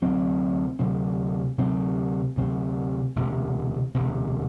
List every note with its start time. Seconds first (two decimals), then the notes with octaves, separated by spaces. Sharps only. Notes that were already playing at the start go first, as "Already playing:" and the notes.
0.02 D2 C3 F#3 C4
0.79 D2 C3 F#3 C4
1.58 D2 C3 F#3 C4
2.36 D2 C3 F#3 C4
3.16 E1 D2 C3
3.94 E1 D2 C3